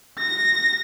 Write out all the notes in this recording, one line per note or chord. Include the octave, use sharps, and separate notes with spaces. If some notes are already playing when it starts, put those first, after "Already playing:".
A#6